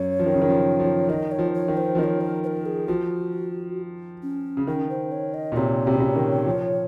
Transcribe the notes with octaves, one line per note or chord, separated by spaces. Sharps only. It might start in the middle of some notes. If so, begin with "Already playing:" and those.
Already playing: F#2 C#5
F3
D#3
C#3
D#3
F3
F3
D#3 D#5
C#5
F3
C#5
D#3
C5
F3
D#3 D#5
C#5
A#4
C5
A#4
G#4
F3 F#4
C#4
C#3
D#3 C#4
C5
C#5
D#5
A#2
C3 C#5
C3
C#3
C3
D#3
F3